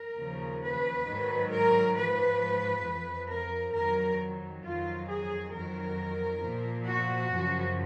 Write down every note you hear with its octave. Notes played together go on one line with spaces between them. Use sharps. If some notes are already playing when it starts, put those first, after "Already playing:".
Already playing: A#4
D#2 C#3 F3
B4
G#2 D#3 F#3
A#4
G#2 F3 B4
F2 F3
A#4
F2 D#3 F#3 A#4
F2 D#3 F#3 F4
G#4
F2 D#3 F#3 A#4
A#2 F3
F#4
F#2 C#3 F3